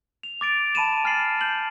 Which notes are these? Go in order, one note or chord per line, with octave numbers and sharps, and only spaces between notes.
F7
D6 A6 D7
A5 B5 D#7 E7
G#5 F6 A6 C7 F#7
D#7
G6 F#7